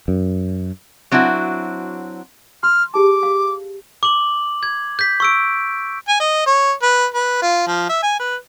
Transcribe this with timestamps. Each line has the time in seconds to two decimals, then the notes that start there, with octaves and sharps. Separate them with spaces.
0.08 F#2
1.11 F#3 C4 D4 E4 F#4
2.63 C6 F6
2.94 G4 G#4 A5 D6
3.23 F5
4.03 D6 F#7
4.63 G#6
4.99 G6 B6
5.20 C#6 E6 D7
6.08 G#5
6.20 D#5
6.46 C#5
6.83 B4
7.14 B4
7.42 F4
7.67 F3
7.89 E5
8.03 G#5
8.20 B4